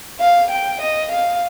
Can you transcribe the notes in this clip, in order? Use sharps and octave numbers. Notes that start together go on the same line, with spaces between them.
F5
G5
D#5
F5